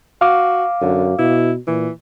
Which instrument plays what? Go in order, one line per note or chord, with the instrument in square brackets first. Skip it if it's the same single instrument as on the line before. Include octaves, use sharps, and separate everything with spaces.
[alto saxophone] F#4 [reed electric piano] F5 D6
[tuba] F#2 [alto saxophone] D3
[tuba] B2 [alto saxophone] E4
[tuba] A#2 [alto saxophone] E3